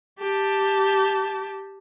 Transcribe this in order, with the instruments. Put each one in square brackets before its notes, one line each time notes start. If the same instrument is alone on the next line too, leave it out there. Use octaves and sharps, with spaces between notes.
[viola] G4 A5